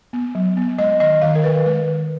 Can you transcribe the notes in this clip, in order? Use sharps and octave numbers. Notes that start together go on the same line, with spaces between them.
B3
F#3
B3
G#3 D#5
D#3 D#5
D#3 F5
A#4
D#3 B4
G#3 B4
D#3